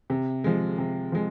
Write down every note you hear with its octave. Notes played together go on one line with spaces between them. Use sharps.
C3
F3 G#3
C3
F3 G#3